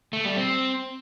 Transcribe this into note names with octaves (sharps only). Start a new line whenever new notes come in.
A3
G3
C4